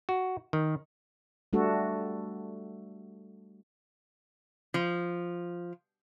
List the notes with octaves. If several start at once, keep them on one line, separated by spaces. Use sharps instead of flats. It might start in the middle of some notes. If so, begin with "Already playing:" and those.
F#4
D#3
G3 A3 D4 F#4 A4
F3